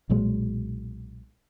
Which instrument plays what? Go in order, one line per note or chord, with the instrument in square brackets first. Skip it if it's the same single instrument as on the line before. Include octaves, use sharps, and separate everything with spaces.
[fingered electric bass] B1 A#2 F#3 G#3